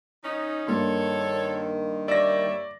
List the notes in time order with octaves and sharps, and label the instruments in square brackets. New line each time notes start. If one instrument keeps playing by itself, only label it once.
[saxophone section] D#3 C#4 D#4
[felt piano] G2 A#3 C6 [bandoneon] D#3 [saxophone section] A4 C#5
[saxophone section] G3 C#5 E5 [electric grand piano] D5 A#6